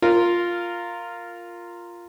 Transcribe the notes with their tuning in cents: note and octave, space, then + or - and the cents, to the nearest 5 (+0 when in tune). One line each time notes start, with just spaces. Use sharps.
F4 +0 A#4 -10